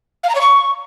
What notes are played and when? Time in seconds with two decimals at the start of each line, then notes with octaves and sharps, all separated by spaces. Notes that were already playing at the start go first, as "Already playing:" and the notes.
0.23 F5
0.29 A#5
0.35 C#5
0.40 C#6